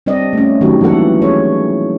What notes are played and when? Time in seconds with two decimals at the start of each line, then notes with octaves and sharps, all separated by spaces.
0.06 G3 C4 D4 D5 D#5
0.33 A3 C#4
0.61 D#3 F#3 A3 D#4 F#4 G4
0.81 E3 G3 A#3 A4 F#5
1.21 C#4 G#4 C#5